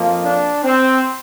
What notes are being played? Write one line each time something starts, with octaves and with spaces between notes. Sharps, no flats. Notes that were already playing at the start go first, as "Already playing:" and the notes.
Already playing: F2 F3 A#3
D4
C4